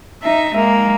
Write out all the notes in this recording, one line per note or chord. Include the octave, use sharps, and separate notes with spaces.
D#4 E5
G#3 A#3